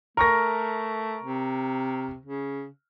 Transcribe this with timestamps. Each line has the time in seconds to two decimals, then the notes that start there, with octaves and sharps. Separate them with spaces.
0.17 A3 A#4 C#6 A#6
1.23 C3
2.26 C#3